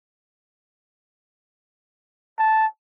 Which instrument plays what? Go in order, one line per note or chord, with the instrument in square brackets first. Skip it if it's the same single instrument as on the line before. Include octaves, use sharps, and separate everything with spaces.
[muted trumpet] A5